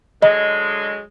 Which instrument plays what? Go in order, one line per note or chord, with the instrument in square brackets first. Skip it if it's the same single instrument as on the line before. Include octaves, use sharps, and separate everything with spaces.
[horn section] D3 F#3 G#3 [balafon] D#5